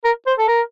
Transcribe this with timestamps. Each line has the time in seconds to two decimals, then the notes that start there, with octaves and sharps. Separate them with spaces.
0.04 A#4
0.27 C5
0.38 A4
0.48 A#4